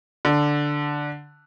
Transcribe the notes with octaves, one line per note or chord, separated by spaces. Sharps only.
D3